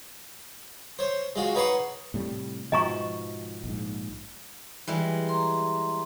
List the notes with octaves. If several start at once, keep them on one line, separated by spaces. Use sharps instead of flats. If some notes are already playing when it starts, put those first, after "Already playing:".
C5 C#5
G#3 F4 F#4
D#4 B4 C#5 F#5 C6 C#6
A2 C3 G3
G#2 B2 F3 D#5 A#5 C#6
A#1 G#2
E3 G3 G#3
A#5 C6